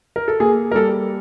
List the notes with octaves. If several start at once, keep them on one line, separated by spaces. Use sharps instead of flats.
A#4
A4
A#3 G#4
A#4
G3 A4